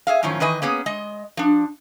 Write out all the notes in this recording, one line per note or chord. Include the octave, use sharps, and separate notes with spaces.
G#4 E5 F5
F#2 A2 D#3 F3 C#4
D#3 E3 B4 D#5 G#5
A#3 B3 C#4 G#4
G#3 D#5
F3 D4